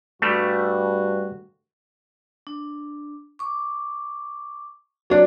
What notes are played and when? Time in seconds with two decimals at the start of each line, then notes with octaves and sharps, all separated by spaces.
0.22 G2 G3 A3 F#4
2.47 D4
3.39 C#6 D6
5.10 F#3 D4